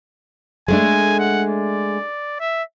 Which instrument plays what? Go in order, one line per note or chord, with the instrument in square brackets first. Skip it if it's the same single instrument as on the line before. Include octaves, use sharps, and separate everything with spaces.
[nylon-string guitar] G#3 A3 D4 [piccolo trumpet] G#5
[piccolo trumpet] F#5
D5
E5